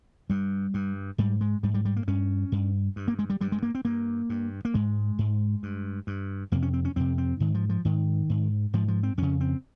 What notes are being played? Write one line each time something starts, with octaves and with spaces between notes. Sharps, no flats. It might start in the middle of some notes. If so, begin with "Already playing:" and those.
G2 G3
G2
G#2 G3
G#3
G#2 G3
G3
G3
A#3
G2 C#4
G2
G2
A#3
G#3
G3
G2 G3
G#3
A#3
C4
G2 A#3
G2
A#3
G#2 G#3
G#2
G2
G2
F2 C3 A#3
C#4
C4
C#4
F2 C3 C4
C4
G#2 D#3
F3
F3
G#2 D#3
G#2
G#2 F3
F3
C4
F2 C#3 C#4
C4